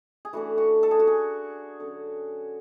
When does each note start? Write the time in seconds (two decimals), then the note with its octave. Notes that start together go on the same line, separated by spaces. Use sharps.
0.25 G#4
0.33 E3 A3 D4 F#4
0.58 F#4
0.83 A4
0.91 G#4
0.99 F#4
1.07 G#4
1.80 D3 F#3 C#4